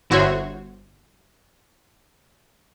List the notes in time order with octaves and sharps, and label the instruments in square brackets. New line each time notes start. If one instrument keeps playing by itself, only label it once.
[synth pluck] G1 E4 F#4 C5 C#5